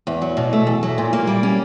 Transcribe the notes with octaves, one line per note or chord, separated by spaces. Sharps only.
E2
F#3
B2
A3
E2
F#3
A#2
A#3
G3
C#4